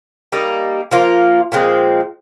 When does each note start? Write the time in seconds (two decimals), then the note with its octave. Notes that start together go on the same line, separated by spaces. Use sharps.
0.32 G3 A#3 D#4
0.91 F3 A#3 F4
1.52 A#2 F3 G#3 C4